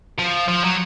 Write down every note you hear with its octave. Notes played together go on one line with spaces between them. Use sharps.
F3
F3
F#3